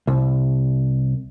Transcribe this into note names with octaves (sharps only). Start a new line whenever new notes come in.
C2